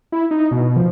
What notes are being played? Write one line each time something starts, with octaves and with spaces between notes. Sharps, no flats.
E4
D#4
B2
F3